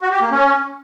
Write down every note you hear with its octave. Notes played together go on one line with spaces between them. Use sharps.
F#4
G4
A#3
C#4